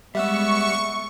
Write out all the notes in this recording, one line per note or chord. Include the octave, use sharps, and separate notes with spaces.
G3 G#3 B3 E5 F#5 C#6 E6